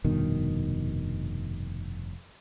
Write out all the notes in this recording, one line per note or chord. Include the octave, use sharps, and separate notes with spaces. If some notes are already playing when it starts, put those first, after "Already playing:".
F1 G2 B2 D#3